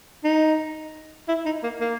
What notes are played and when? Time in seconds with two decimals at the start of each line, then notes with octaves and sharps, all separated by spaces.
0.24 D#4
1.28 E4
1.46 D#4
1.63 A#3
1.81 A#3